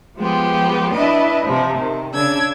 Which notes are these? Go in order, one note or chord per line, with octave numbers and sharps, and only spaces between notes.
F3 G#3 B3 G4
D4 E4 B4 D#5
C3 F3
D#3
C#3 D4 E6 G#6